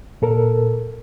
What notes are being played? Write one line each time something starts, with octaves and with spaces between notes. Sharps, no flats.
A#2 A4 A#4